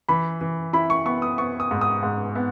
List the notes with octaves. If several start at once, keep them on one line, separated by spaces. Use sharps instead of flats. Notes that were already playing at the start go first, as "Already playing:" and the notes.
E3 B5
E3
E4 B5
C#6
B3 C#6
D#6
B3 C#6
D#6
G#2
D#6
G#2
B3